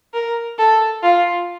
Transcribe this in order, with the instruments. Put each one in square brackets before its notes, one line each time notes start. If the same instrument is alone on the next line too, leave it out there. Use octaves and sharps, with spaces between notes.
[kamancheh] A#4
A4
F4